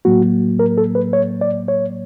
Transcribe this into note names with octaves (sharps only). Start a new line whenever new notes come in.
A2 F#3 A#3 F#4
A#4
A4
B4
C#5
D5
C#5